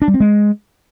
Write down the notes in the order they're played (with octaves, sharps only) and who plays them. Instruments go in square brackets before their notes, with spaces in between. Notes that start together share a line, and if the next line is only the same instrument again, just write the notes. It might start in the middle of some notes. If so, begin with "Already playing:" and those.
[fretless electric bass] D4
G3
C4
G#3